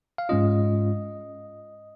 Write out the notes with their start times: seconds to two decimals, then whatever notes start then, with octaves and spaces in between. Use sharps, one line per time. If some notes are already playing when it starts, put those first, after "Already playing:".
0.18 F5
0.29 G#2 G#3 C#4 F4 D#5